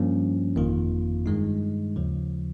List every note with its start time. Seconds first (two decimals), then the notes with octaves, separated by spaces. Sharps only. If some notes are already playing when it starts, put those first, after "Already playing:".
Already playing: G2 F3 A#3 C#4
0.56 G1 F2 D#3 A#3 F4
1.26 G2 D#3 G#3 D#4
1.96 D#2 C#3 F3